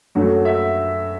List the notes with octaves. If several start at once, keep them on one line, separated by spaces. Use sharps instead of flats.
F#2 F#3 A3 F#4
E5